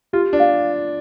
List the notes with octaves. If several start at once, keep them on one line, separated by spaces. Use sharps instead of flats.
F4 G4
D4
F5